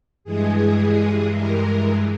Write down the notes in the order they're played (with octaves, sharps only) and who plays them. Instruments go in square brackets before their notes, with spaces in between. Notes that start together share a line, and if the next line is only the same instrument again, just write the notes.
[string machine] G2 E3 G#3 G#4
A#4